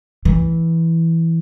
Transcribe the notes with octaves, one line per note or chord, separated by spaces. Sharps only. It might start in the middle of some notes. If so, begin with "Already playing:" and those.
E3